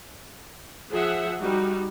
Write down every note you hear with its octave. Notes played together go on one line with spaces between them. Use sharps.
F3 G#4 E5 F#5
G3 D#4 F#4